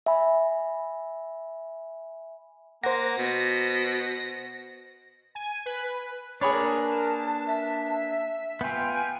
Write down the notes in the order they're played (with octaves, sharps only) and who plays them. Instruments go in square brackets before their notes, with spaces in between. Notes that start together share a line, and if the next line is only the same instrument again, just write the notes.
[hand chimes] E5 G#5 B5
[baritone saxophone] A#3 [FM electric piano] C5 F#5 [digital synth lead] A#6
[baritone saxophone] B2
[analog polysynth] G#5
B4
[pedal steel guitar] A#3 D4 [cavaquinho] G#4 B5 D6 [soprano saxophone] C#5
[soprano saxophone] A#4 [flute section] B4 A5
[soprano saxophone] E5
[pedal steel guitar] B3 F4 [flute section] G5 G#5 G6